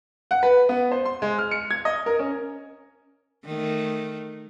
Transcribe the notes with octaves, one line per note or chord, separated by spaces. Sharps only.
F#5
B4
B3
C5
C6
G#3
F6
C#7
G#6
D#5
A#4
C#4
D#3 A3